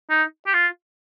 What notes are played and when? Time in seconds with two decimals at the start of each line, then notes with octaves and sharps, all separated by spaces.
0.10 D#4
0.46 G4
0.54 F4